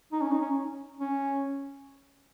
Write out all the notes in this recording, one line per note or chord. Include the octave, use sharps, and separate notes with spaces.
D#4
C#4
D#4
C#4
C#4